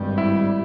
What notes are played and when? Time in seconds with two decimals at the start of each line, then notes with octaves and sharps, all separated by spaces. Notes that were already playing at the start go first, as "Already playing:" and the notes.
Already playing: G#1 G2 G3
0.18 E4